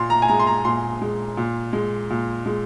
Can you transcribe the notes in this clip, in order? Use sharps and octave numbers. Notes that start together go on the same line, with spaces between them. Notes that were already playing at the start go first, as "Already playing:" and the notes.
Already playing: A#2 C6
A#5
G#5
G#3 A#5
C6
A#5
A#2 C6
G#3
A#2
G#3
A#2
G#3